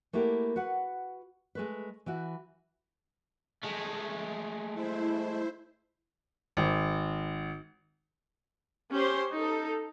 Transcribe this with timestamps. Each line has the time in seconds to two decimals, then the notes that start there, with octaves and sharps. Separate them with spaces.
0.13 A3 A#3 E4 F#4 G4
0.56 F#4 B4 F#5
1.55 G#3 A3 B4
2.06 E3 E4 F#4
3.64 G#3 A3
4.73 E4 C5
6.57 G#1
8.94 C#4 G4 C5 C6
9.32 D#4 A4